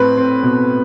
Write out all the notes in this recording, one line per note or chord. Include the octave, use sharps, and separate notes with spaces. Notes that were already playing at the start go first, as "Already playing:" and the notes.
Already playing: A2 C4 B4
C4
B2